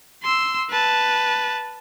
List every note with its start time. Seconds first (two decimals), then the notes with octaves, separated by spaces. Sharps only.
0.23 C6 E6
0.70 B4 A5